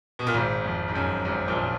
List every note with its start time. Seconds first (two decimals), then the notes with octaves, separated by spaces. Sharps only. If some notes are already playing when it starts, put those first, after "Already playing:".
0.19 B2
0.27 A#2
0.34 G#1 G#2
0.64 F2
0.88 G#2
0.95 F#2
1.25 G#1 G#2
1.48 A#1 A#2